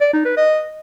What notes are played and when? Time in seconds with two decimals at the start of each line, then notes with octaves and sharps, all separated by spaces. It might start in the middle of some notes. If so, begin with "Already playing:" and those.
0.01 D5
0.13 D#4
0.25 B4
0.37 D#5